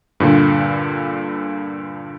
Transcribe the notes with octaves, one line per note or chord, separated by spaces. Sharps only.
G2 A#2 D3